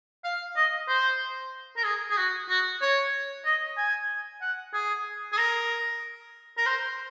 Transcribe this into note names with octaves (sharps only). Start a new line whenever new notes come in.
F5
D#5
C5
A#4
G#4
G#4
F#4
F#4
C#5
D#5
G#5
F#5
G#4
G#4
A#4
A#4
C5